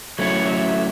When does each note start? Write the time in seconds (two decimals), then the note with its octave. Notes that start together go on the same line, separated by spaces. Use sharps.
0.19 F#3 A3 C#4 E4 C#5
0.48 E5